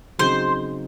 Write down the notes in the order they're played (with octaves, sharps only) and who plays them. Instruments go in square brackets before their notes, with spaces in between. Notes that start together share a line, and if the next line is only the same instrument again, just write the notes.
[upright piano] C#3 F#3 C4 D#4 G#4 [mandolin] C5